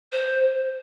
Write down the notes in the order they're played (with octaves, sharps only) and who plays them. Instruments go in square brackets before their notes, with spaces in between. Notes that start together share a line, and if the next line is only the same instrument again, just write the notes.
[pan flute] C5